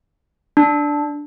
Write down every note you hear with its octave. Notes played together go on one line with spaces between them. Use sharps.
D4